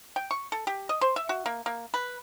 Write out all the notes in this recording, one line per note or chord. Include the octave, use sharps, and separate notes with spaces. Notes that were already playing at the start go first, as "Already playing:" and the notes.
G5
C#6
A4
G4
D#5
C5
E5
F#4
A#3
A#3
B4